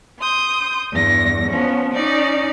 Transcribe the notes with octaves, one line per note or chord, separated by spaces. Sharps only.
C6 D#6 G6
E2 G2 A#6
F3 B3 C#4
C#4 D#4 D5